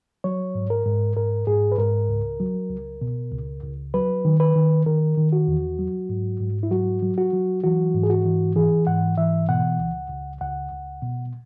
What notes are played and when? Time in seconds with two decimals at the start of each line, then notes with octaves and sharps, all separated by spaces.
0.24 F#3 C#5
0.55 G#2
0.70 A#4
0.86 G#2
1.17 G#2 A#4
1.47 G#2 G#4
1.72 B4
1.78 G#2 A#4
2.09 C#2
2.40 F#3
2.70 C#2
3.01 B2
3.32 C#2
3.63 C#2
3.94 F#3 B4
4.25 D#3
4.40 B4
4.55 D#3
4.86 D#3 A#4
5.17 D#3
5.33 F#4
5.48 E2
5.79 F#3
6.09 G#2
6.40 G#2
6.63 E4
6.71 F#3 F#4
7.02 F#3
7.18 F#4
7.33 F#3
7.64 E3 F#4
7.95 G#2
8.03 G#4
8.10 F#4
8.25 E3
8.56 E3 G#4
8.87 G#2 F#5
9.17 E3 E5
9.49 B2 F#5
9.79 C#2
10.10 C#2
10.41 C#2 F#5
10.72 C#2
11.02 B2